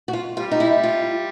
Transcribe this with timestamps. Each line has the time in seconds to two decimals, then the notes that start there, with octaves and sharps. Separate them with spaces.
0.08 F#4
0.13 F4
0.36 G3 F4
0.51 D#4
0.60 E4
0.83 F4